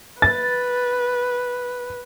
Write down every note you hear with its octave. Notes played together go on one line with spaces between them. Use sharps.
B4 A6